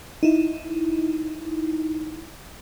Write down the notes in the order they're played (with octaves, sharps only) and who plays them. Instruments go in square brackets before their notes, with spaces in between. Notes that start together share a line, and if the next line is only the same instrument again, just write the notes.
[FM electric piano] D#4 E4